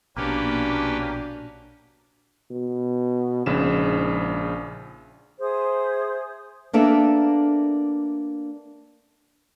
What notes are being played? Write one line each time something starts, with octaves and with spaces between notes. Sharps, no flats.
A#1 B2 A#3 C#4 D4 F#4 G4 B4
B2
A#1 G#2 C#3 E7
G#4 C5 E5 D#6
A#3 B3 D4 A4 A#4 E5